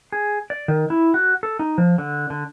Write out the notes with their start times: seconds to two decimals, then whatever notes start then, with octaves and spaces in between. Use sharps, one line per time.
0.12 G#4
0.50 D5
0.68 D#3
0.90 E4
1.14 F#4
1.43 A4
1.59 D#4
1.78 F3
1.98 D3
2.30 D3